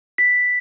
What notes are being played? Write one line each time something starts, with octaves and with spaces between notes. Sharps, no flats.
B6